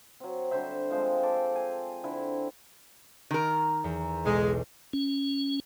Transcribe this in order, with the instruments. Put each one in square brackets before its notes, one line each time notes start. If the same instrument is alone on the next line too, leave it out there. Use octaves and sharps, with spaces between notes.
[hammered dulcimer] F#3 C4
D3 G3 C5 E5
F3 G#3 C4 C5
A4 D6
G#5
D3 C4 E4
[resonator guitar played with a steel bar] D#3 A#4
[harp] E2
[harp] B1 [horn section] G#3
[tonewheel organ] C#4